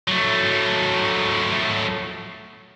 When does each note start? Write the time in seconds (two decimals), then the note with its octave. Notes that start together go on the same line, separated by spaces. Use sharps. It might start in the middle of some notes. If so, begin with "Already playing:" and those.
0.08 F#3 A3